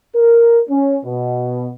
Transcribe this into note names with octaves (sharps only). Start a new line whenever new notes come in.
A#4
C#4
B2